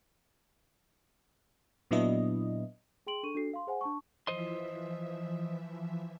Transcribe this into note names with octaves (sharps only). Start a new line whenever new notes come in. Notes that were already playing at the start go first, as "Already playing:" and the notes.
A#2 F#3 B3 D4 E4 D#5
G#4 G5 C6 D7 F#7
D4 A4 C#6 D#7
D4 F#4 A4 C7
F5 C6
G#4 C5 F#5 G#5
D4 A5 C#6
E3 F3 C5 D#5 E5 C6